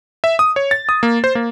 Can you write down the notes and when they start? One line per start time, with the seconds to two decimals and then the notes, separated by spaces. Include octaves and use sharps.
0.24 E5
0.39 D#6
0.56 C#5
0.71 A6
0.89 D#6
1.03 A#3
1.24 C5
1.35 A#3